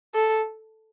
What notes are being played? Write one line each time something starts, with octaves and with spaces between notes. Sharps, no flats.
A4